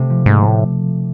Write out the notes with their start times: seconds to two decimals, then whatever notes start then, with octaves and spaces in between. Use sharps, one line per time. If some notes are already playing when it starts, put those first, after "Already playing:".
Already playing: C3 A3
0.10 F3
0.26 G#2 A3
0.42 C3
0.47 A2